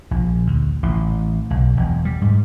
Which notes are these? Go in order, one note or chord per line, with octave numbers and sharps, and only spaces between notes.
A#1
D2
A1
B1
E1
G3
G#2